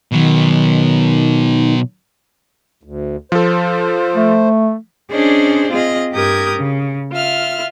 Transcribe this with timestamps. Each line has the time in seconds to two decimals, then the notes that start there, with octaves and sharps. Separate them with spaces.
0.12 B2 D#3 F#3
2.83 D2
3.32 F3 A4 C5
4.16 A3
5.10 C#4 D4 G#4 C5 D5 D#5
5.71 C4 F4 G#4 D#5
6.13 G2 G4 A#4 D#6 G6 G#6
6.55 C#3
7.12 F4 E5 F6